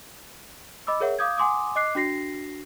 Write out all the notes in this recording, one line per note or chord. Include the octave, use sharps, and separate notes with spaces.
D#5 B5 D6 E6
G#4 A#4 C#5 E5 F#5
F5 D6 D#6 G6 G#6
F#5 G#5 C6 D6 D#6
D#5 D6 F#6 C7
D4 F#4 A#6 C7